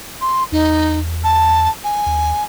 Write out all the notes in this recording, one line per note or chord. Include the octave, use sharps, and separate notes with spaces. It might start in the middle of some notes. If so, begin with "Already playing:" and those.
C6
E2 D#4
A5
G#5
D#2